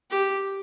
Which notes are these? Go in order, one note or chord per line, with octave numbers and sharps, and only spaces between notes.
G4